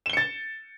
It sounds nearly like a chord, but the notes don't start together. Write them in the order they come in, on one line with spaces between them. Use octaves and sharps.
E7 G7 C#7 A6